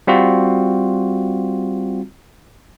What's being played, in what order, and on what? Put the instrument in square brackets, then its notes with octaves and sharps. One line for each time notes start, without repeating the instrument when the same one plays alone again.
[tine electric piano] G3 C4 F4 F#4